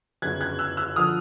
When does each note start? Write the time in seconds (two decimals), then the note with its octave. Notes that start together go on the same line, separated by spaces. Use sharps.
0.22 G1 F#2 C#3 F#3 F#6 G#6
0.41 F#6 G#6
0.59 E6 F#6
0.77 E6 F#6
0.96 D3 F3 D#6 F6